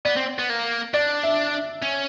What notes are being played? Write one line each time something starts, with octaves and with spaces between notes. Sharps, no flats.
B3 D5
C4
B3
A#3
D4 D5
E5
C#4